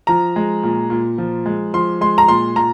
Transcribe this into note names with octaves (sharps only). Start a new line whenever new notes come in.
F3 A#5
G#3
A#2
A#2
F3
G#3
F3 C6
G#3 C6
A#5
A#2 C6
A#2 A#5